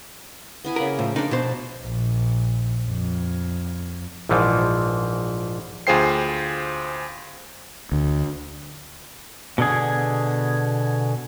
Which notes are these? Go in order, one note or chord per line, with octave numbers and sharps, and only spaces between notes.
B3 E4 G#5
C#3 A#3 A#4 B5
A2 F3
D4 D#4 A#4 D5
B2 C5 A5
A#1
F2
A#1 G#2 E3 F3
D2 F4 G#4 C5 G5 C7
D2
B2 D3 G#4